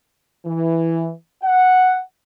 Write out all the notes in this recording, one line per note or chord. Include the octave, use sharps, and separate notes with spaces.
E3
F#5